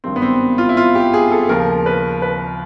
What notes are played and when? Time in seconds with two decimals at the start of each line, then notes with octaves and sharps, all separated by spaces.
0.04 G#1 G2 D#3 G3 C4
0.16 B3
0.22 C4
0.58 F4
0.69 E4
0.77 F4
0.95 G4
1.14 G#4
1.32 A4
1.49 D#2 C#3 F3 A#4
1.86 B4
2.22 B4